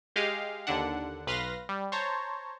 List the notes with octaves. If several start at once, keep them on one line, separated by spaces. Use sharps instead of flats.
G#3 G4 D#5 F5
D#2 D3 D4 F#5
B1 B4 F5 C6 A#6
G3
C5 C#5 A5 A#5